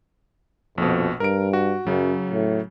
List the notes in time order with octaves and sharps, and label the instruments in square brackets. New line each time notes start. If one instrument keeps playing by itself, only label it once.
[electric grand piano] A#1 B2 [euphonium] F2
[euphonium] G2 [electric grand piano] A#4 D7
[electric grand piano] F#4
[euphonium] F#2 [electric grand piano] C#3 F#3
[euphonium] A2